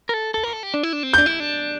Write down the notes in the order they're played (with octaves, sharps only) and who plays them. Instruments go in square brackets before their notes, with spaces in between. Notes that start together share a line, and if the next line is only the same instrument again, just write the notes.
[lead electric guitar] A#4
A4
A4
A#4
A4
G4
D4
E4
D4
C4
[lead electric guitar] D4 [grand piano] G6
[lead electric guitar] E4
D4